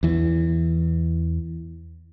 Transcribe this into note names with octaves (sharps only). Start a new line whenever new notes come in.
E2 E3